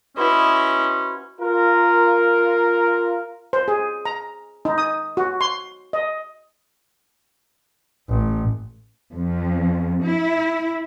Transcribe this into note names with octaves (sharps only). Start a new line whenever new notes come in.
C#4 E4 F#4 B4 C5 D#5
F4 A#4
C5
G#4
A#5
D#4
D#6
F#4
C6
D#5
A1
F2
E4